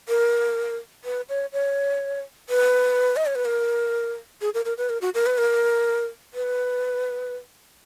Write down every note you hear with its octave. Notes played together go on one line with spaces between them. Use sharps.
A#4
B4
C#5
C#5
B4
D#5
C#5
B4
A#4
G#4
A#4
A#4
B4
A#4
F#4
A#4
B4
A#4
B4